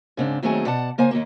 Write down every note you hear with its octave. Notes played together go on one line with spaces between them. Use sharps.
G#2 C#3 C4 D4
D#2 D#3 F#3 A3 C4 G#4
B2 D5 F#5 A5
C#3 A#3 C5 G#5
D#2 G#2 A#3